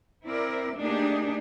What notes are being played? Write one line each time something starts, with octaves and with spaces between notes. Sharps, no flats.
C4 E4 A#4 D5
A3 A#3 D4 D#4 G4 G#4